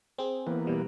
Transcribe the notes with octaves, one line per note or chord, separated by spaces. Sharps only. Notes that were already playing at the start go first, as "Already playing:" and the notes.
C4 G#4
E3 A#3 B3
B2 G3